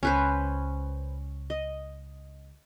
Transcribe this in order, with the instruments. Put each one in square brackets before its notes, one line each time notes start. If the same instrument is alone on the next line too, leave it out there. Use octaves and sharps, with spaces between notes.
[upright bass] C#2 [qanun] C#4 B4 C5
[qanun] D#5